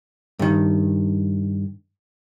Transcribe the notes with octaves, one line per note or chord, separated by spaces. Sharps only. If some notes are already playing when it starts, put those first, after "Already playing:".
G2 D#3